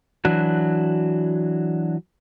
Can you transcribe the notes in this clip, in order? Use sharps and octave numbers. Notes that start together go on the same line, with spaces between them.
E3 F#3 D4 F#4